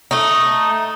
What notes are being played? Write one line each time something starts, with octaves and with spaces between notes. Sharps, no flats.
A3 D#4